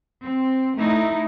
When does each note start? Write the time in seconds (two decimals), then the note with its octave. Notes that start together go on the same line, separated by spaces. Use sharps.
0.22 C4
0.76 A3 D#4 E4